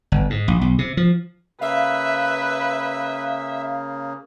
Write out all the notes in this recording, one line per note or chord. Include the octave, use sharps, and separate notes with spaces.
G1
G#2
A#1
B1
C3
F3
C#3 A#3 B4 E5 F5